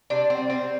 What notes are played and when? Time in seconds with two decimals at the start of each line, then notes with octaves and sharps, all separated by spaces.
0.10 C3 D4
0.30 C4
0.37 G3
0.50 C4
0.63 G3